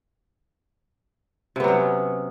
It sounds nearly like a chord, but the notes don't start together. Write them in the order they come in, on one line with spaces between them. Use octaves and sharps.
C3 B3 F#3 C#4